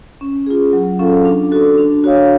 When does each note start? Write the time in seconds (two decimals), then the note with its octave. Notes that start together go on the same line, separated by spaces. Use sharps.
0.21 C#4
0.46 F4 G#4
0.73 F#3
0.99 C#4 F4 A4 F5
1.25 D4
1.51 F#4 A4
1.78 D4
2.04 F#4 C#5 F5